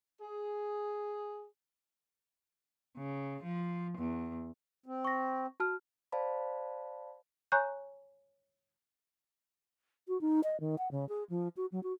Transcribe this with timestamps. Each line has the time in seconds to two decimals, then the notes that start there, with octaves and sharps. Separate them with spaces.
0.21 G#4
2.97 C#3
3.43 F3
3.98 E2
4.86 C4
5.05 C#6 A#6
5.60 F#4 A5 F6
6.12 C5 D5 F5 A5 B5
7.52 C#5 G#5 A#5 C#6 F#6 G6
10.08 F#4
10.21 D#4
10.44 D#5
10.60 D#3
10.78 F#5
10.91 C#3
11.09 G#4
11.30 F3
11.57 F#4
11.72 F#3
11.83 F#4